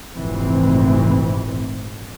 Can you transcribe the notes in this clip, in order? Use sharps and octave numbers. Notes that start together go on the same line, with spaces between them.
F1 A#1 G#2 E3 C4